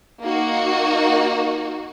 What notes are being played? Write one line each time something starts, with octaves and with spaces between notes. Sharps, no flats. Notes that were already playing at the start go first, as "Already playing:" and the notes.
A#3 D#4 F#4